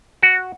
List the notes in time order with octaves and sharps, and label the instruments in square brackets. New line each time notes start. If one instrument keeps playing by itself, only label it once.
[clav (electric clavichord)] F#4